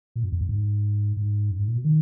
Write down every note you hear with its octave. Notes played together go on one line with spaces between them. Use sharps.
A#2
F#2
F2
F#2
G#2
G#2
F#2
G#2
A#2
B2
D#3